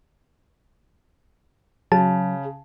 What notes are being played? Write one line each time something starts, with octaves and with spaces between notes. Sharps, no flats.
C#3 F#3 A5